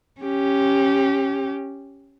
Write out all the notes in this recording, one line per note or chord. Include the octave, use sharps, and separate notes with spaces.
C#4 G4